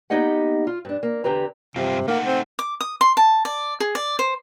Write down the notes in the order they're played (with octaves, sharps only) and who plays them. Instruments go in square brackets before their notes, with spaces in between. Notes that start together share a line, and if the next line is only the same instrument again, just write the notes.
[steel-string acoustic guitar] A#3 B3 D#4 G4 D#5 F#5
F4
G2 D4
A#3
E2 D3 C4 G4 B4 A#5
[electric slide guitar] G2 C4 F4 [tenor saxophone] C3
[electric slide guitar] A3 D#4 F#5 [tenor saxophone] A#3
[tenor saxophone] C4
[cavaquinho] D6
D#6
C6
A5
D5
G#4
D5
C5